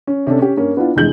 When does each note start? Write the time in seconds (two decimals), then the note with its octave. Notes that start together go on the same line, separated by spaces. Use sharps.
0.07 C#4
0.27 C3 C#4 D4 A4
0.39 C#4 G4
0.57 G2 A#3 C#4
0.77 B3 D4 E4 F4
0.96 F1 G2 E3 G#3 G6 F#7